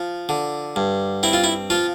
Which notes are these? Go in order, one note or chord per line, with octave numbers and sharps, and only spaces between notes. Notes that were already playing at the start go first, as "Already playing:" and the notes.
Already playing: F3
D3
G2
C4 E4
F4
E4
F3 F4